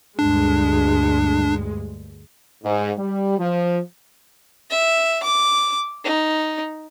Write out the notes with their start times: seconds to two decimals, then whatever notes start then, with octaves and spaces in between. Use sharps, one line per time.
0.19 D2 G2 G#3 D4
2.64 G#2
2.97 G3
3.39 F3
4.70 E5
5.23 D6
6.04 D#4